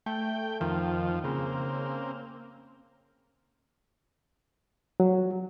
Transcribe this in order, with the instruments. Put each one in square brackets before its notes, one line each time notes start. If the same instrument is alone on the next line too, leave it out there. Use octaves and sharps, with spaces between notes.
[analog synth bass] A3 [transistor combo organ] G5
[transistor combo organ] F2 F3 [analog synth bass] D#3
[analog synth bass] C#3 [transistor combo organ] A#3 C4
[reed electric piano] F#3